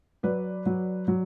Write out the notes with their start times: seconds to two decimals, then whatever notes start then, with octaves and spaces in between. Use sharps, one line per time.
0.23 F#3 B4 D5
0.66 F#3
1.08 F#3